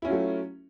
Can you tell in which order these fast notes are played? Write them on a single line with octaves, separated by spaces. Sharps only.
E4 C#4 F4 F#3 A3